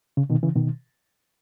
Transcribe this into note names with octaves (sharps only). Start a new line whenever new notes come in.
C#3
B2 D#3
C#3 E3
B2 D#3